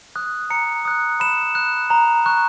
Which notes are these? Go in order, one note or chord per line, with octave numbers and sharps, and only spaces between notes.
D#6 F#6
A#5 C#7
D#6 F#6
B5 E7
F#6
A#5
C#6 F#6